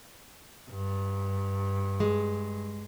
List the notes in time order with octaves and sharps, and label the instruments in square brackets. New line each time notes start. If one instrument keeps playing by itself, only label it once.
[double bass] G2
[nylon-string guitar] G#3